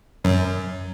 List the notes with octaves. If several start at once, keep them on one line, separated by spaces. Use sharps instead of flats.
F#2